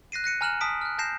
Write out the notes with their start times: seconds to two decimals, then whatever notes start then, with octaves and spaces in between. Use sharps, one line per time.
0.12 F#6 A#6 C7 D#7
0.24 F#6 A#6 C#7 D#7
0.41 G#5 A#5 F6 F#6 E7 F#7
0.61 A5 D#6 B6 D7
0.82 F6 F#6
0.98 A5 G6 A#6 C7 E7